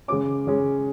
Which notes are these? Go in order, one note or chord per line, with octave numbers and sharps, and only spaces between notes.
C#3 G#3 C#4 D6
C#3 G#3 C#4